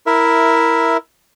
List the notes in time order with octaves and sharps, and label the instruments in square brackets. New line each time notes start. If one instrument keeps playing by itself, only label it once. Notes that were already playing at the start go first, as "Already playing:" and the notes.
[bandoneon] E4 A#4 E5